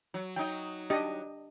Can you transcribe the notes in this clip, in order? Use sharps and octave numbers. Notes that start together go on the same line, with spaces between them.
F#3
F#3 D#4 G5
D4 G4 D#5